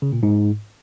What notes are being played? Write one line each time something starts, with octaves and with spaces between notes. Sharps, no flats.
C#3
A#2
G#2